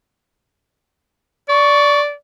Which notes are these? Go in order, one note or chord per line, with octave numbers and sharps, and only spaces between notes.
D5 C#6